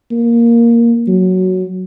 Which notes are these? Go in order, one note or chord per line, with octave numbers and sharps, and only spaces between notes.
A#3
F#3